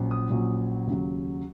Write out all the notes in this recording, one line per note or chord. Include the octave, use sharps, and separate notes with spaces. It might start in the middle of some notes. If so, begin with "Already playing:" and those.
Already playing: A#1 A#2 F#3 C#4
D#6
A#1 A#2 F#3 C#4
D#2 C#3 F#3